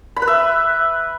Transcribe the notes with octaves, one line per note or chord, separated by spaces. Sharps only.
B5
B4
E5